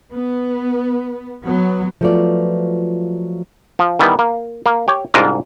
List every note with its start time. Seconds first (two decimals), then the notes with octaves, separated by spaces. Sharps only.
0.15 B3
1.43 F#3 B3
2.01 F3 F#3 A3 B3 F4 D5
3.79 F3
3.99 D#3 E3 G3 B3
4.19 A#3
4.66 A#3
4.88 G4 C#5
5.14 C2 G#2 D4 F4 D#5 A#5